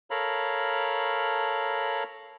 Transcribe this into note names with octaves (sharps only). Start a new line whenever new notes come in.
A4 A#4 C#5 F5 A#5 B5